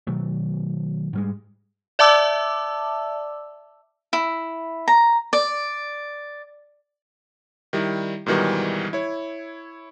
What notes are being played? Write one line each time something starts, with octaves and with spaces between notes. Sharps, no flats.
B2 D#3 F#3 A3
G#2 G3 G#3
D5 E5 A5 D6 E6
E4
A#5
D5
D#3 G3 E4
G#2 B2 D#3 E3 G3
E4 C#5